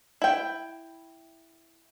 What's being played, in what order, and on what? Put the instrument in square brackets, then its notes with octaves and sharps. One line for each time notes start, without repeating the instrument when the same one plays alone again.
[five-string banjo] E4 G5